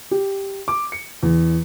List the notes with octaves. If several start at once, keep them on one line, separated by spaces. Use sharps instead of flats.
G4
D6
C#7
E2